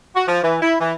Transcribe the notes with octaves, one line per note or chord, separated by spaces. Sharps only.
F#4
F3
E3
E4
E3